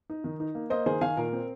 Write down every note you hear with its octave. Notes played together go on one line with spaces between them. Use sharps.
D#4
D#3
D#4
A#3
A#3 C5 D#5
D#3 G#4 C5
D#3 F5 G#5
A#2 A#4
C4